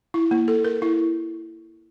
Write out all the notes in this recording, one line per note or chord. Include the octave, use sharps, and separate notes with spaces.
E4
A#3
A4
A#4
E4